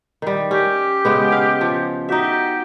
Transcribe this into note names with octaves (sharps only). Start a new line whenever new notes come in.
D#3 G3
C#4 G4
C#3 G#3 B3
F5
F3
D#4 F#4 G4 E5